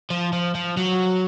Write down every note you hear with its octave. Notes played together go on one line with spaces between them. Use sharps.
F3
F3
F3
F#3